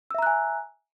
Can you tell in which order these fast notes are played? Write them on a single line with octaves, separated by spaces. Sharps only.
E6 E5 A#5 F#6 G#5